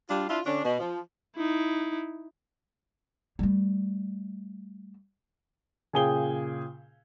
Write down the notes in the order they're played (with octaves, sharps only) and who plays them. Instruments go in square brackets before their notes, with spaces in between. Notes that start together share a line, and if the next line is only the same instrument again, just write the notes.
[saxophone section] G3 D4 F4
D4 E4 F4
D3 C#4 D4
B2
F3
[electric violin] D#4 E4
[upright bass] G3 A3
[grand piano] A#2 C#3 G#4 G5 G7